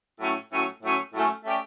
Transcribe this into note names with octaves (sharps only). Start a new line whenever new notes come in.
A2 F#3 A3 C#4
A2 F#3 A3 C#4
A2 F#3 A3 C#4
A2 F#3 A3 C#4
A3 C#4 G4 D5